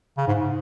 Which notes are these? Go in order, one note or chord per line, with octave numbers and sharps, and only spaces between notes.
C#3
G#2